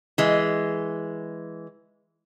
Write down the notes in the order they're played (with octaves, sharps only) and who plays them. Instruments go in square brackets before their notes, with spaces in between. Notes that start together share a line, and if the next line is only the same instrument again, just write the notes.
[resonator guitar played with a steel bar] E3 G#3